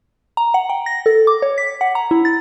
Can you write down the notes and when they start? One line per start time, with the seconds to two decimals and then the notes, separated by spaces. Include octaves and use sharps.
0.37 A#5
0.54 F#5
0.69 G5
0.86 A#6
1.06 A4
1.27 D6
1.42 C#5
1.58 B6
1.81 F#5
1.95 A#5
2.11 E4
2.25 A6